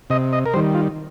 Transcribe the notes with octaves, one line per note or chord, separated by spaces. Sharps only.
C3 D#5
D#5
A#4
D#3 G3 C5
F4